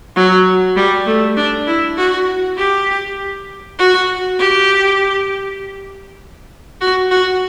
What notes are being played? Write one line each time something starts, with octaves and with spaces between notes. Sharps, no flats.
F#3
G3
A3
D4
E4
F#4
G4
F#4
G4
F#4
F#4